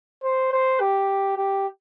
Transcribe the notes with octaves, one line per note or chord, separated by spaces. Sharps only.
C5
C5
G4
G4